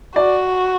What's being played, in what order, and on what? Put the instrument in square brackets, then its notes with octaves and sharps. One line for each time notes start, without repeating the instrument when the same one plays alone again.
[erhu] F#4 [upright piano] D5